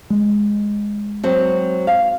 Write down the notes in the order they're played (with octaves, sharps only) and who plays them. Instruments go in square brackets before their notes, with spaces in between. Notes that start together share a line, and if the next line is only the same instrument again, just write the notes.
[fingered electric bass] G#3
[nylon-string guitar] F#3 C4
F5